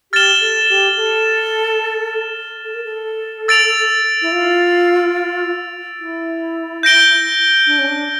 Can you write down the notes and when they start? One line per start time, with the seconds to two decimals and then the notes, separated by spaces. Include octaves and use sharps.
0.12 G4 F6 A6 E7 G7
0.40 A4
0.69 G4
0.96 A4
2.64 A4
2.75 A#4
2.85 A4
3.48 E6 A6 D7 F7
4.22 E4
4.32 F4
5.99 E4
6.83 G6 A#6 D7 G7
7.67 D4
7.79 C#4
7.88 D4